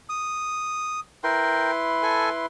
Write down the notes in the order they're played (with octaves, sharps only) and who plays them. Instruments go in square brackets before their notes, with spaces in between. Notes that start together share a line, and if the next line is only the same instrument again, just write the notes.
[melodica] D#6
[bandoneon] E4 B4 C6 [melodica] A#4 G5
[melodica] A4 G#5